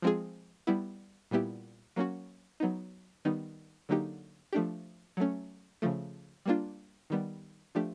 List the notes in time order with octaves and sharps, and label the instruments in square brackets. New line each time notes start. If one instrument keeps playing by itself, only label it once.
[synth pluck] F3 G#3 C4 F4 G#4
G3 B3 E4
A#2 G3 B3 E4 G4
F#3 A#3 C#4 F#4
F#3 B3 D#4
D#3 G3 B3 D#4
D3 F#3 A#3 D#4 G4
F3 A3 D4 G4
F#3 A3 C#4
C#3 F3 A3
G3 A#3 D4 F4
D#3 G3 B3
F3 A3 D4 G4